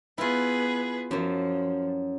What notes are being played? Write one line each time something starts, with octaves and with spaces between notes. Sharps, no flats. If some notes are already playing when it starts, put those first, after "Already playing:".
B3 E4 F4 G#4 B4
F#2 F3 F#3